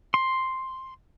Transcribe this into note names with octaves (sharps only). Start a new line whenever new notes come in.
C6